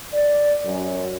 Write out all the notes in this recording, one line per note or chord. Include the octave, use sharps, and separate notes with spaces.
D5
F#2